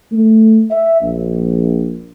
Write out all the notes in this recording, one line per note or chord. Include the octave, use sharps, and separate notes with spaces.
A3
E5
A#1